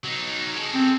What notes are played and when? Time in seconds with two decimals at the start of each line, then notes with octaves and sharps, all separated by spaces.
0.04 F#3 D#4
0.54 G#3 A4
0.74 C4